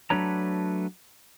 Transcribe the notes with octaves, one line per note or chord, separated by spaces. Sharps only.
F#3 A3 D4 B4 C#5 A#5